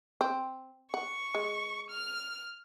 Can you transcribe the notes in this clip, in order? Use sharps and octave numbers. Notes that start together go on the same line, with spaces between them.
C4
F#5 C#6
G#3
F6